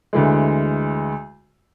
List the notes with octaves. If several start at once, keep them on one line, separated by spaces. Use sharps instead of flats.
D2 E3 G#3